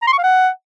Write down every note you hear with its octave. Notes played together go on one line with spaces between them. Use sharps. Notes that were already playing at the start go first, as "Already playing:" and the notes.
A#5
C6
C#6
F5
F#5